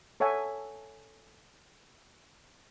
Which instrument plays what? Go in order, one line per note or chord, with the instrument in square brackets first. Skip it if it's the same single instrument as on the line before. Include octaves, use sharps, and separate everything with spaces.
[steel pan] A4 C#5 E5 F#5 G#5